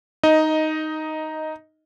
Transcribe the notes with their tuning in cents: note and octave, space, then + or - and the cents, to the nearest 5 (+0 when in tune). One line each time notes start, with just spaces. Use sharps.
D#4 +0 D#5 +10